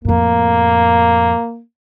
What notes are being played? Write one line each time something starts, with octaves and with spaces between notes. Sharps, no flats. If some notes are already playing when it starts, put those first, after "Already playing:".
F2 A2 A#3